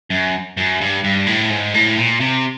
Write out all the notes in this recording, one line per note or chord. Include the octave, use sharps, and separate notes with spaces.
F#2
F#2
G2
G2
A2
G#2
A2
A#2
C3